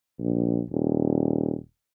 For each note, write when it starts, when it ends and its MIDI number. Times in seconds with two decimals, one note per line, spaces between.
0.19 0.61 34
0.71 1.56 27